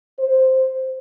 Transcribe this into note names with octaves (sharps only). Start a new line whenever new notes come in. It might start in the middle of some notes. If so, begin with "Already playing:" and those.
C5